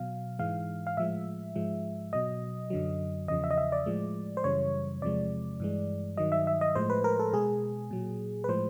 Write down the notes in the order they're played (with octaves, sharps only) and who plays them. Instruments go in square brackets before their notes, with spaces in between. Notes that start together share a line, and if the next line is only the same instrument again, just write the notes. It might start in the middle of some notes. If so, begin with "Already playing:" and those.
Already playing: [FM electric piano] B2 F#3 F5
G#2 E3 G#3 F5
F5
A2 F3 G#3 E5
G#2 F3 G#3
B2 F#3 D#5
F#2 D3 F#3
E2 C#3 F3 D#5
E5
D#5
E5
D5
A2 F3 G#3
C5
F#2 C#3 E3 G3 C#5
E2 C3 F3 G#3 D5
G2 E3 G#3
G2 D#3 F#3 D#5
E5
E5
D#5
A2 F3 G#3 C5
B4
A#4
A4
B2 G#3 G#4
A#2 F#3
B4
A2 F3 G#3 C5